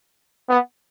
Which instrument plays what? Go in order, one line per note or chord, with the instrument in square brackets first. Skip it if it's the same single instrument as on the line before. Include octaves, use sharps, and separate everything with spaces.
[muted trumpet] B3